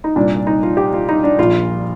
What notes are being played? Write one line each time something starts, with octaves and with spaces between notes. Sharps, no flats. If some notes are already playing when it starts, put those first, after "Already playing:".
D#4
C2 A#2 D4
D#4
F4
G4
F4
D#4
D4
A#1 A#2 F4